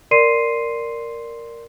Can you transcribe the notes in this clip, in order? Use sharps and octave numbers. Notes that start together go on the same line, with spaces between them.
A#4 D5 C6 C7 D#7